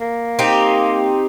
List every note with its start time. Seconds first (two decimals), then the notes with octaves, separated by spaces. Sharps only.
0.01 A#3
0.39 C4 D#4 G4